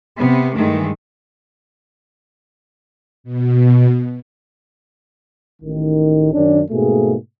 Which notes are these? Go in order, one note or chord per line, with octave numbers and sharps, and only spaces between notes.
C3 B3
G2 D#3 E3 G#3 A3
B2
A1 D#3
F#2 D#3 C#4 D4
G#2 B2 A3 A#3 G#4